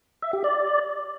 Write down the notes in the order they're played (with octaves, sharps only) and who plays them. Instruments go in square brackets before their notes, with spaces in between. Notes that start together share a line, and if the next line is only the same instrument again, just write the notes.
[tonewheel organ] E5
G4
D5